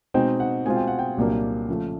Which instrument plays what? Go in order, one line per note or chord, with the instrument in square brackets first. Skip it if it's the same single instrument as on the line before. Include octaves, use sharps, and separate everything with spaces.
[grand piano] B2 G#3 C4 D#4 G5
F#5
B2 G#3 C4 F4 G#5
G5
F#5
G5
C2 A#2 F#3 A#3 D4
C#3 F3 A3